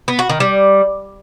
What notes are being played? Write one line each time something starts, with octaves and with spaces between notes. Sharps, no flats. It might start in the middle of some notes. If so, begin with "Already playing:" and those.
B3
F#4
D#3
G3